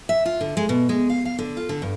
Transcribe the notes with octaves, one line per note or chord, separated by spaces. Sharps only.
E5
F4
D3
G#3
B2
G#3
F5
F5
D3
F4
D3
G2